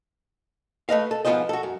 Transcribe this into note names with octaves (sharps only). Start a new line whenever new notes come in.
A3 B4 D#5 F5
A4
G#2 F3 B3 F4 C5 D#5
F#4 A4
F#2